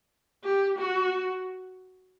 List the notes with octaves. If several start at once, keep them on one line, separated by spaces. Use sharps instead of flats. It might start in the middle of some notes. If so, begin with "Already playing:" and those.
G4
F#4